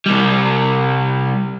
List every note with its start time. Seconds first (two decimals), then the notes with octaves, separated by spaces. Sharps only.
0.06 C2 G3